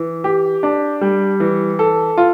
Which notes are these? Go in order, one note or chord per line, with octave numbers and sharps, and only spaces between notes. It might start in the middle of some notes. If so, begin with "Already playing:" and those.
Already playing: E3
G4
D4
G3
E3
A4
F4